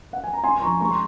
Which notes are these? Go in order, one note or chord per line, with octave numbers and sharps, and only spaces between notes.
F#5
G#5
A#5
C4 G#5 C6
C6
F3 A#5 C#6
G#3 A#5 C#6
C6